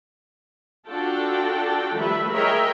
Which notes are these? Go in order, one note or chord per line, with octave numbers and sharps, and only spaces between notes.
D4 F4 F#4 A4 G5 A5
D#3 F3 G3 A3 B4 E5
G#4 A#4 C#5 D#5 E5 G5